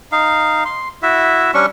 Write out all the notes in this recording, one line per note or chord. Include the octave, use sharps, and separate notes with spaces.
D#4 F5
C6
E4 F#4 E5
G3 C#4 D4 C#6